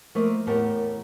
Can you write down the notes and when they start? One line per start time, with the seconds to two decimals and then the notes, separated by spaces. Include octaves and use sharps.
0.15 F3 A3 A#3 A#4 D#5
0.47 E2 A2 G4 A#4 F#5 A5